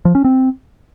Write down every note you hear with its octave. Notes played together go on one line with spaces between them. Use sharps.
F3
C#4
C4